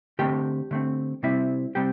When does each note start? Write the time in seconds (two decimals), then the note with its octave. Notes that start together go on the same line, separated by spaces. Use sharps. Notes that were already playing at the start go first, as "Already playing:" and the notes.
0.19 D3 A3 C4 G4 G5
0.71 D3 A3 C4
1.23 C3 G3 C4 E4 E5
1.75 C3 G3 C4 G4 G5